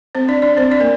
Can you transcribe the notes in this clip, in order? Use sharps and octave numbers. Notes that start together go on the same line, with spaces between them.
C4 C5
D4 D5
D4 D5
C4 C5
D4 D5
A#3 A#4